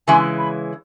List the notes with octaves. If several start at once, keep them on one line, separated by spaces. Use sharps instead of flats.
C#3 E3 G#3 G#5
B5